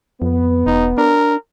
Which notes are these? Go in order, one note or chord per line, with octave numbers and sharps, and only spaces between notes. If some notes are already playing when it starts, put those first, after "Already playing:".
F2 B3
E1 D#4
D4 A#4